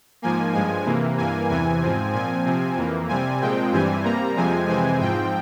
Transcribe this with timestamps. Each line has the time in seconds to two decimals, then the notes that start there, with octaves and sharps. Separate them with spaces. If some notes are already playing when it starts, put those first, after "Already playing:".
0.22 G#2 F3 A#3 G#5
0.54 G2 F3 G#3 G#5
0.86 C3 E3 A#3
1.17 G2 E3 A#3 G#5
1.49 E2 C3 E3 G#5
1.82 G#2 F3 C4
2.13 A#2 F3 C4 G#5
2.45 C3 F3 C4
2.77 F2 E3 A#3
3.08 C3 G3 C4 G#5
3.41 A#2 F3 G#3 C4 G5
3.72 G2 E3 G3 C4 G#5
4.04 C3 G3 A#3 A#5
4.36 F2 C3 F3 G#3 C4 G#5
4.68 F2 C3 E3 G#3 C4 G#5
5.00 G#2 F3 C4 G5